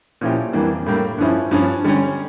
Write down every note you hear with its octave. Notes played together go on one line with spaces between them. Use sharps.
A#2 F3 C#4 E4 G4
F2 E3 G3 A#3 D4
A2 G3 A#3 D4
G2 F3 C#4 E4
G2 F3 C#4
D3 G3 C#4